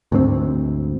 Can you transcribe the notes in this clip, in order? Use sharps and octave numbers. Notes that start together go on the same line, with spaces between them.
D2 G#2 A3 C4